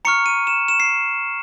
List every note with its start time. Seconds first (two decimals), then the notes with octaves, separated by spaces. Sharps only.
0.05 A#5 C#6 F6 C#7
0.26 D#7
0.47 E7
0.68 E7
0.80 C7